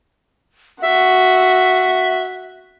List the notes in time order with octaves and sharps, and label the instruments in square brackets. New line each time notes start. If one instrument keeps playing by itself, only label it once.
[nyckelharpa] F#4 [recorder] E5